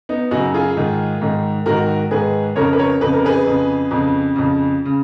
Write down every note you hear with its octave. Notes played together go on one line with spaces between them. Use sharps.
B3 D#4
F#2 C#3 D#4 F#4
F4 G#4
G#2 D#3
G#2 D#3
G#2 D#3 F#4 A#4
G#2 D#3 G#4 B4
F2 C#3 A#4 C#5
B4
A#4 C#5
F2 C#3 B4
A#4
G#4 B4
F2 C#3
F2 C#3
F2 C#3
C#3